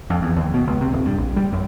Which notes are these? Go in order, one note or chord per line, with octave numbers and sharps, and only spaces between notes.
F2
E2
D#2
B2
C#2
C3
D#1
G2
A#1
G3
F#2